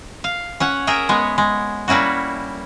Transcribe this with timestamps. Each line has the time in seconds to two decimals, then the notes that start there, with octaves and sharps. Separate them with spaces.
0.24 F5
0.60 C#4 C#5 F#5
0.87 G#4 A#4 E5 G5
1.09 G#3 B3 C#5
1.38 G#3
1.88 G3 A#3 C#4 E4 F#4